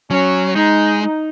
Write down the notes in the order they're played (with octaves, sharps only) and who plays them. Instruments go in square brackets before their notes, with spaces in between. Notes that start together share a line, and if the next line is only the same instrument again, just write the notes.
[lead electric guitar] F#3 [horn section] C#4
[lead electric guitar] G#3 [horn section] D#4
[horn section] D#4